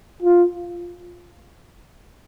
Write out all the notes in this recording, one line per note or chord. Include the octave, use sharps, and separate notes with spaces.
F4